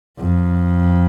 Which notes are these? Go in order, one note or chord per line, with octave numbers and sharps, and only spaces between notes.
F2